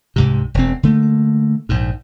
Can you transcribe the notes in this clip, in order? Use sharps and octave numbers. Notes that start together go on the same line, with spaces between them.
C2 G#2 C3
E1 C4
D3 A3 A#3
A#1 G#2